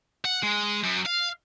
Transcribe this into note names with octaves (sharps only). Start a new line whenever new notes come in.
F#5
G#3
F#2
F5